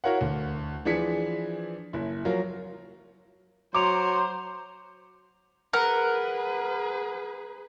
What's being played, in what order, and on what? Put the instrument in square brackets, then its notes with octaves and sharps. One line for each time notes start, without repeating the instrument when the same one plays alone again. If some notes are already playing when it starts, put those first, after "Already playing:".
[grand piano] E4 F#4 A#4 C#5 F5 F#5
D2
E3 F3 D4 G#4 B6 C#7
F#1 E4
F3 F#3 F4 A#4
[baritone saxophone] F#3 [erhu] C5 [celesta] A#5 C6 F7 [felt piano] D6
[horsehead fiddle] G#4 B4 [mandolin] A#4 F#5